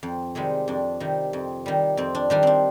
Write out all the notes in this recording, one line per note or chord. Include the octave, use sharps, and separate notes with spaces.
F2
C3 D#3 G3 G#3 G#4
F2 D4
C3 D#3 G3
F2
D#3 G3
F2 C4
D4
D#3 G3 D4
C4 D4